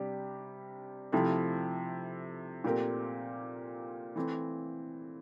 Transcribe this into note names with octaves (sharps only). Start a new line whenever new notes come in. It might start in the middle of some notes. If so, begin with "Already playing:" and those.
Already playing: C3 G3 D4 G4
C3 F3 A3 E4
A#2 A3 C4 G4 A#4
E3 A3 C4